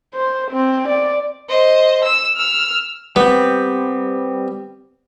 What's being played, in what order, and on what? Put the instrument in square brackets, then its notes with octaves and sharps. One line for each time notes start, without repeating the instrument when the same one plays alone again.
[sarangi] C5
C4
D5
[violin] C5 D#5
E6 E7
E6 F6
[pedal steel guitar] G3 C4 [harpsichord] B3